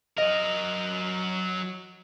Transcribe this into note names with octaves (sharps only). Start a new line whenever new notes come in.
F#3 A#4 D#5